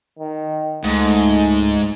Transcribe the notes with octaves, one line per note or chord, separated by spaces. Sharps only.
D#3
C#2 G#2 A3 D#4